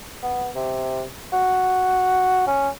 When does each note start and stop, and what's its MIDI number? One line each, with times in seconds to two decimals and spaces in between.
0.23 0.49 59
0.55 1.03 48
1.33 2.45 66
2.47 2.68 61